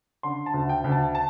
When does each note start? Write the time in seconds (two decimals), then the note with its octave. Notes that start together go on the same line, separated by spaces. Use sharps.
0.23 D3 C6
0.46 A5
0.54 D2
0.69 G5
0.84 D2
0.92 A5
1.15 A5